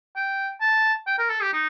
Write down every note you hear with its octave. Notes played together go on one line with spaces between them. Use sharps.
G5
A5
G5
A#4
A4
G4
D#4